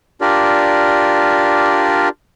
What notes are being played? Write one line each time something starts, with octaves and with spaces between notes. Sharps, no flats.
D4 F4 G4 A#4 D5